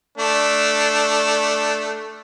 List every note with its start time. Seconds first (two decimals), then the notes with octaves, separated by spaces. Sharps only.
0.18 A3 D4